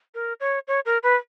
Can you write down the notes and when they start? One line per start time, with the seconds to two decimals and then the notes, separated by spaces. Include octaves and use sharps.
0.15 A#4
0.40 C#5
0.68 C#5
0.86 A#4
1.03 B4